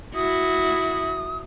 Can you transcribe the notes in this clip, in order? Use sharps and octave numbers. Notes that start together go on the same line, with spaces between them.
E4 F#4 D#6